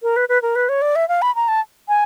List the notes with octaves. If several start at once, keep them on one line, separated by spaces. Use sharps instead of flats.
A#4
B4
B4
A#4
B4
C#5
D5
E5
F5
B5
A#5
A5
G#5